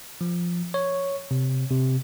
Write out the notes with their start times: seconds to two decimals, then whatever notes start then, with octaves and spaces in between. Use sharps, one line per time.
0.21 F3
0.74 C#5
1.31 C3
1.71 C3